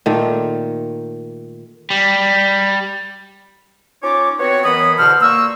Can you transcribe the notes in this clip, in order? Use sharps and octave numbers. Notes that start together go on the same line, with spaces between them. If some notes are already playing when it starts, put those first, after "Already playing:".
A#2 D#3 A3
G3
C#4 D#4 F4 C#5 D6
B3 C4 F#4 C#5
F#2 E3 B3 D#5 B5 D#6
E2 B2 D3 A4 C5 F6
A#2 A#3 C#6 E6